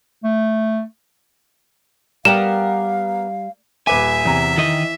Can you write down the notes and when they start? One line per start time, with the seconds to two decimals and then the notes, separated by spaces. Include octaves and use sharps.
0.24 A3
2.25 G3 B3 G4 A#4 F5 E7
3.87 D#1 B4 E5 G#5 D6
4.25 E2 C3 A#5
4.58 D#3 E3 D#5